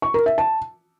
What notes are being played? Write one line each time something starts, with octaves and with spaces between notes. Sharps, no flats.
C#6
A#4
E5
A5